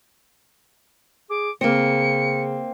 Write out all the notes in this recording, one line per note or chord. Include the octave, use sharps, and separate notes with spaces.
G#4 D6
C#3 A#3 C4 C#7